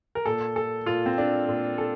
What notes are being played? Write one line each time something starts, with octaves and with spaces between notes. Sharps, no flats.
A#4
A#2 A4
A4
A#2 F4
C4
D4
A#2
A4